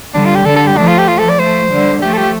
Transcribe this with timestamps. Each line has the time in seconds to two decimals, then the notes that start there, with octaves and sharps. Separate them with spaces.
0.14 D3 G3 D4
0.25 F4
0.35 G4
0.45 D3 G3 A4
0.56 A4
0.67 G4
0.76 F3 A3 D4
0.87 F4
0.98 G4
1.08 F4
1.19 A4
1.29 D5
1.39 F3 A3 C5
1.71 D3 G3
2.02 F3 A3 G4
2.13 A4
2.17 G4